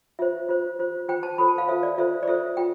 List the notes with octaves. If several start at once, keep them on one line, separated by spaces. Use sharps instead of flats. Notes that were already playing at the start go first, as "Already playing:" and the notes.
F4 C5 E5
F4 C5
F4 C5
F4 C5 G5
A5
F4 A4 C5 B5
A5
F5
F4 A4 C5 E5
D5
F4 A4 C5 E5
D5
F4 A4 C5 E5
F4 G5